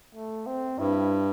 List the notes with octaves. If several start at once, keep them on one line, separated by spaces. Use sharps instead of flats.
A3
C4
G2 E4